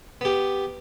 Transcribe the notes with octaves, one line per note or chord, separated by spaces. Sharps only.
B3 G4